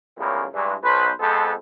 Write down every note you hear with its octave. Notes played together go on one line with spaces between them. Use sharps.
C#2 F#2 A2 G3 A#3 B3
G2 E3 G#3
B1 B4 C5
F2 G#3 B3 A4 C5